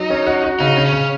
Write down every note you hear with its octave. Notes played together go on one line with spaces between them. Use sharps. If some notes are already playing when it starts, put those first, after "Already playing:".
Already playing: F#3 D#4
C#4
F#4
F#4
C#3 D#4
C#3
C#4
C#3